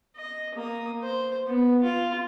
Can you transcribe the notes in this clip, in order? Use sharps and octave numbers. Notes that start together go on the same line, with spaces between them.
D#5
A#3 D#6
C5
B3
F4